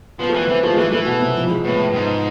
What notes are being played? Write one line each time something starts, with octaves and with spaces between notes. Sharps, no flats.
F3 B3
A3
E3 B3
E3 C4
F3 A3
G#3
E3 A3
E3 A3
B2
C3
F3
G#3
A2 B3
G#2